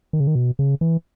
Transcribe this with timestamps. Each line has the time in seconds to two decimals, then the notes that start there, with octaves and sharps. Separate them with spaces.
0.13 D#3
0.20 C#3
0.27 D#3
0.35 B2
0.59 C#3
0.81 E3